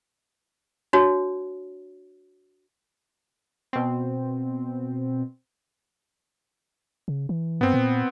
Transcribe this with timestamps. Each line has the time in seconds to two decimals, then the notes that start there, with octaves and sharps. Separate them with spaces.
0.93 D4 F#4 C#5
3.73 B2 C4
7.08 C#3
7.29 E3
7.61 G2 B3 C4
7.74 A#2